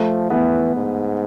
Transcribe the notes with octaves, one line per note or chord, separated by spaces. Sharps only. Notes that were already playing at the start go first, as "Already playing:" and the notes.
Already playing: F3 A3
E3 B3
G#2